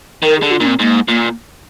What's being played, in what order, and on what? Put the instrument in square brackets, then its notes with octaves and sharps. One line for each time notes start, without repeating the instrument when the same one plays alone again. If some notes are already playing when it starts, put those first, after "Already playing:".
[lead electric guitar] D#3 [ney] A#4
[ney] G#4
[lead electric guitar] D3
[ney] F4
[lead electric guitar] A#2 [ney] D4
[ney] C4
[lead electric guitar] G#2 [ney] A#3
[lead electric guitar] A#2 [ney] A#3